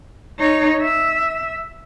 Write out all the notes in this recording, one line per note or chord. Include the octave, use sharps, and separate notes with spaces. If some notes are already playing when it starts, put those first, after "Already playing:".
D#4 C#5
E5